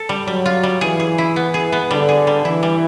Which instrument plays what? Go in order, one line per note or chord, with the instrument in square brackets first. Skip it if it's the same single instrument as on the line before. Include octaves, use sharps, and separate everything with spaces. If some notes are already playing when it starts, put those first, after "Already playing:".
Already playing: [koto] A4
G3
[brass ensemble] F#3 [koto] G3
[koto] F4
G3
[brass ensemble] E3 [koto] G#4
[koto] G#4
E4
B3
G#4
B3
[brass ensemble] D3 [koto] G3
[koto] G#4
G3
[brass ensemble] E3 [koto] E4
[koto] G3